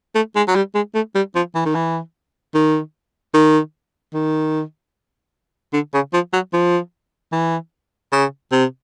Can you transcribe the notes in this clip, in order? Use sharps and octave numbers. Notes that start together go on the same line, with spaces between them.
A3
G#3
F#3
G3
G#3
A3
G3
F3
E3
D#3
E3
D#3
D#3
D#3
D3
C#3
F3
F#3
F3
E3
C#3
C3